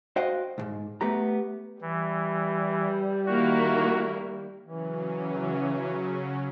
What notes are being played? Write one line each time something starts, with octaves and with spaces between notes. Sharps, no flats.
F#4 C5 D#5 F5 G5
B1 G#2
A3 B3 G4 A#5
E3 G3
D#3 A#3 E4 F#4
C#3 E3 F#3 C#4